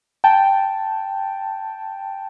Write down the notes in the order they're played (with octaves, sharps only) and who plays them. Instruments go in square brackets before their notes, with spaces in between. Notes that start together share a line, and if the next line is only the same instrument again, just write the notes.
[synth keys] G5 A5